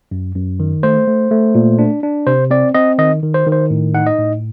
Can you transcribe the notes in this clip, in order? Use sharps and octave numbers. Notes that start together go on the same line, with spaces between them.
F#2
F#2
D#3
A3 C5
A3
A3
A#2
D4
D4
C3 C5
C4 D5
C4 D#5
D#3 D#5
D#3
C5
D#3
C5
A2
D#4 F#5
D#5
A2